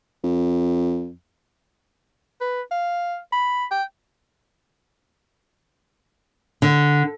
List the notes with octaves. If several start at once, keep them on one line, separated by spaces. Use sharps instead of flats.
F2
B4
F5
B5
G5
D3